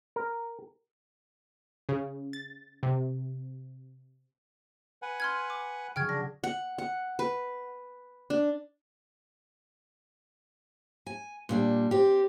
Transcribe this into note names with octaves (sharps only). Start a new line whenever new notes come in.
A#4
C#3
A6
C3
B4 F#5 G#5
C6 F6 G#6
D6
C#3 F#3 G5 F6 G#6
D4 A#6
F#5
F#5
B4
D4
G#5
A#2 G3 D4
C4 G4